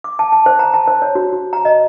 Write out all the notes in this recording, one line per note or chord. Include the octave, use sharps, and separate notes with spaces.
D6
A5
A5
C5
A#5
A5
C5
C#5
F#4
F#4
A#5
D#5